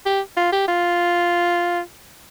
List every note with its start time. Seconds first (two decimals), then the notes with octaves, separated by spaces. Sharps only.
0.06 G4
0.37 F4
0.53 G4
0.68 F4